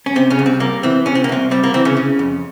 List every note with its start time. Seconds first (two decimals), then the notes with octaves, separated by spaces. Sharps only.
0.06 C#4
0.16 C3 C4
0.30 C#3 C#4
0.39 C2
0.46 C4
0.60 G3 A#3
0.83 E3 C4
1.06 C3 C#4
1.15 C4
1.24 A#3
1.29 C2 C4
1.51 G3 C4
1.64 A#3
1.74 E3 C4
1.85 C#3 C#4
1.97 C#3
2.19 F2